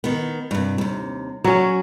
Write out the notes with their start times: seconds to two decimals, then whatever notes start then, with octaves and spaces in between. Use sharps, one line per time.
0.04 D#3 B3
0.51 G2 C3
0.78 D#2 C3
1.44 F#3 C#4 F#4